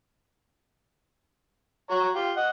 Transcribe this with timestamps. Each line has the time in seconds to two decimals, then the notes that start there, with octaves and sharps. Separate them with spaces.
1.90 F#4 C#5 A#5
2.15 F4 G4
2.37 D#5 F#5